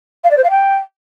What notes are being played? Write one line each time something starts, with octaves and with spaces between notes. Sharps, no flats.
F5
D5
C5
F5
G5